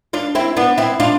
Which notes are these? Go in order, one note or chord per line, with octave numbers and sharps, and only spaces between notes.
D4 F4
C4 E4
B3 D4
C4 E4
D4 F4